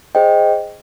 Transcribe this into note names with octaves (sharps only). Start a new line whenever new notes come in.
G#4 C5 D#5 G5